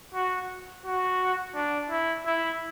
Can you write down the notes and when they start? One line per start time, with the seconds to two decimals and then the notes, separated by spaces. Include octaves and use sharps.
0.14 F#4
0.85 F#4
1.55 D4
1.90 E4
2.26 E4